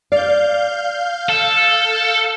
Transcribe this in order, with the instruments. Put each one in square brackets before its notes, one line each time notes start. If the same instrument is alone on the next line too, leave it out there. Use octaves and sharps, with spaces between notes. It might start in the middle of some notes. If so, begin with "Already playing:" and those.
[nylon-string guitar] D5 [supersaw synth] F5 G6
[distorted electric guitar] A4